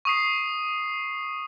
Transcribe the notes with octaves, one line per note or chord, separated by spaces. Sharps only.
C#6 D#6 C7